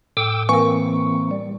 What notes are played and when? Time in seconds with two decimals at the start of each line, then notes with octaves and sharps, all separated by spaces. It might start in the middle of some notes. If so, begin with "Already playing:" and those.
0.17 A2 G5 D6 E6
0.49 E3 A#3 C4 A#4 G#5 C#6
1.31 G3